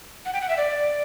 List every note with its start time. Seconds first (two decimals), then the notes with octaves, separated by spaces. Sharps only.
0.25 F#5
0.33 G5
0.41 F#5
0.49 E5
0.57 D5